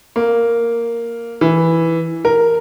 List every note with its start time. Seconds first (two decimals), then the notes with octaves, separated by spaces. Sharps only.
0.16 A#3
1.41 E3
2.25 A#4